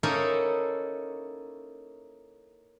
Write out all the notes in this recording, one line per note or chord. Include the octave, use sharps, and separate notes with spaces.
A#3 C#4 D#4 E4 A4